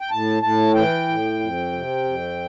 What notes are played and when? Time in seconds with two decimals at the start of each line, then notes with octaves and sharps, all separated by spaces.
0.01 G5
0.11 A2 A5
0.42 A2 A5
0.75 E3 G5
1.08 A2
1.39 F2
1.72 C3
2.04 F2